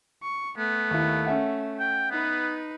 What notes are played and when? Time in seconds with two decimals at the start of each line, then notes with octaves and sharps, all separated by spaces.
0.23 C#6
0.58 A3 B3
0.91 D#2 E4
1.26 C#4 E5 F#5
1.79 G5
2.11 B3 D#4 B4